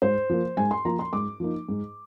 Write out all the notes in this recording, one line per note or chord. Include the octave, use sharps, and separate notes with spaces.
G#2 C5
F3 A#3
G#2 G#5
C6
F3 A#3 A#5
C6
G#2 D6
F3 A#3 D#4
G#2